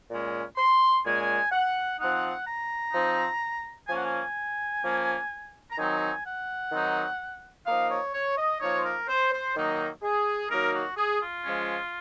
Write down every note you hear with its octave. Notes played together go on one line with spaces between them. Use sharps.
A#2 G#3 C#4
C6
A#2 G#3 C#4 G#5
F#5
F3 C4 D#4 F#5
A#5
F3 C4 D#4
F3 A#3 C#4 G#5
F#5
G#5
F3 A#3 C#4
A#5
D#3 F#3 C4 D#4 G#5
F#5
D#3 F#3 C4 D#4
F3 A#3 D#4 F5
C#5
C#5
D#5
F3 A#3 D#4 C#5
C5
A#4
C5
C5
D#3 F#3 A#3 D#4
G#4
D#3 F#3 A#3 D#4 A#4
F#4
G#4
F4
F3 G#3 C#4